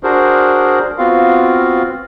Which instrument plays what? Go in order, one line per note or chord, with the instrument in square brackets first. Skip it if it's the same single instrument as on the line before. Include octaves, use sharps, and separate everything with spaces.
[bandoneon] D4 F#4 G#4 A#4 C5
B3 C4 F4 F#4 F5